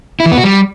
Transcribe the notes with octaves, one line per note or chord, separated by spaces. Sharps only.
E4
E3
B3
F#4
G3